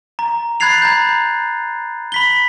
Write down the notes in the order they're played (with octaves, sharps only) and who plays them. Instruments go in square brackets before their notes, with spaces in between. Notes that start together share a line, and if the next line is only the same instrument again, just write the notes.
[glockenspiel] A#5
B5 F#6 G#6 A6 C7 F7
A#5 B5 G6
B5 B6 G7